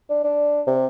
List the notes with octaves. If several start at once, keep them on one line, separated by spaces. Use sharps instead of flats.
D4
D4
C3